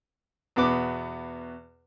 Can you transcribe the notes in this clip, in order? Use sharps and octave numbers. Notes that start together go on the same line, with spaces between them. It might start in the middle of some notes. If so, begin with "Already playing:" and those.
E2 B2 B3 D6